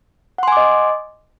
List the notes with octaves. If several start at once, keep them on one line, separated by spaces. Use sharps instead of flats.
D#5 F#5 G#5 C6 D6